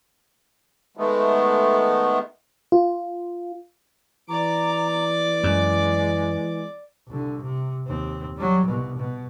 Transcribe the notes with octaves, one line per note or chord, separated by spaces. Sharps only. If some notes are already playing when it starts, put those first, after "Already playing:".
D#3 G#3 A3 B3
F4
E3 D5 A#5 D6
F#2 G#3
C2 D3
C3
D#2 C4
F#3 G3
C2 B2
B2